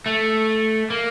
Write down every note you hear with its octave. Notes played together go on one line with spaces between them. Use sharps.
A3
A#3